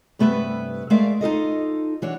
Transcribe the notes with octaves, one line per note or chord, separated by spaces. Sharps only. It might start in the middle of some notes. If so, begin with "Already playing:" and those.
G2 C3 A3 B3 B4 E5
G#3 A3 A#4 D5 E5 F5
D#4 F4 A4 D#5
E3 D4 F#4 C#5